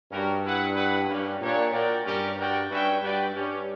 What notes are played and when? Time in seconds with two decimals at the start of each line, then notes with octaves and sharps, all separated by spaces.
0.12 G2 G3 C#4 F#4 A#4
0.44 E4 B4 F#5
0.76 E4 B4 F#5
1.09 G2 G3 A#3 C#4 G4 B4
1.41 A#2 D4 G4 C#5
1.73 A#2 F#4 A#4 D5 G5
2.05 G2 G3 C#4 G4 A#4 D5
2.38 F#4 A#4 D5 G5
2.70 G2 C#4 F#4 B4 E5 G5
3.02 G2 F#4 B4 D5 G5
3.34 G2 G3 C#4 G4 C#5